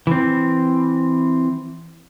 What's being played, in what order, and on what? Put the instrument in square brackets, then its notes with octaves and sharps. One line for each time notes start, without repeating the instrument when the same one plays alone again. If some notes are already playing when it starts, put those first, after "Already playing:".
[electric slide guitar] E3 C4